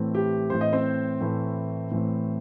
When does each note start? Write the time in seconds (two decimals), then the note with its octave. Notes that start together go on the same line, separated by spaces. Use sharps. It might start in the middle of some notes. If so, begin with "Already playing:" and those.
Already playing: A2 E3 A3 C4
0.15 G4
0.49 A2 E3 A3 C4 C5
0.61 D#5
0.73 C4 C5
1.20 A2 E3 A3 C4
1.91 A2 E3 A3 C4